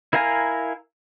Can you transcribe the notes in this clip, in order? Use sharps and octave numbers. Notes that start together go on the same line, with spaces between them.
E4 A#4 F5 G#5 A#5